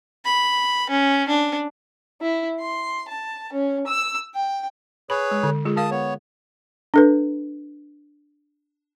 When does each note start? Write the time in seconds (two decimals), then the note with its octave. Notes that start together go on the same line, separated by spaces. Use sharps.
0.25 B5
0.90 C#4
1.29 D4
2.21 E4
2.60 C6
3.08 A5
3.53 C#4
3.87 E6
4.34 G5
5.10 G#4 B4 C#5 B5
5.31 G#3
5.43 D3
5.65 G#3 F4 G#4
5.77 A#4 F5 A5 D#6
5.91 B3 C#5
6.94 D4 A4 B4